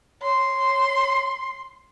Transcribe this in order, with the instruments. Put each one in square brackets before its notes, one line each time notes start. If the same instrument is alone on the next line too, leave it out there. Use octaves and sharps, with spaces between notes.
[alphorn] C#5 [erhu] C6